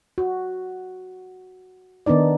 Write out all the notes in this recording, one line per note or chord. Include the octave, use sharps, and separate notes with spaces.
F#4
D#3 B3 D4 D#4 D5